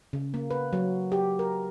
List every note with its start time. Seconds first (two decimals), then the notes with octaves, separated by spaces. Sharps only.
0.13 C#3
0.34 A#3
0.51 B4
0.73 F#3
1.12 G4
1.39 A#4